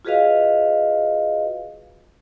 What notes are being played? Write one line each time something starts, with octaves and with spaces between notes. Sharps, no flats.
F4 F#4 G#4 B4 D#5 F5